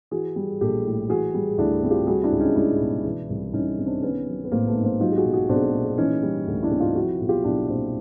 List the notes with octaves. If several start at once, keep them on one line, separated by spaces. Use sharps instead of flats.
E3 F#4 G#4
G3
A#1 G4 A4
A2
E3 F#4 G#4
G3
D2 D4 E4
C3
F4 G4
G3 F#4 G#4
D4 E4
C#2
C#4 D#4
C#2 D4 E4
B2
E3
C2
C2 C#4 D#4
C3
C4 D4
D#3 B3 C#4
F#3
B3
A1 A#3 C4
A3 B3
G#2
A#3 C4
F#3 D#4 F4
G4
F#4 G#4
B1
F#4 G#4
B1 C4 D4
A#2
E3 C#4 D#4
G3
D2
D4 E4
C3
D#4 F4
F3 E4 F#4
B1
F4 G4
B1 D4 E4
A#2 C4 D4